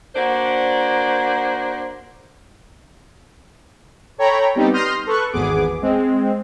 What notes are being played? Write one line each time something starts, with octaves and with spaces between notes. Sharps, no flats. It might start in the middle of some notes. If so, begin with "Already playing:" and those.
A#3 D4 F#4 C5
A4 C#5 G5 A#5 B5
G3 B3 C4 D#4 G4
C6 D#6 F6 G6 A#6
A4 B4 C#6 F#6
G#1 E2 B3 G#4 D6
G#3 C4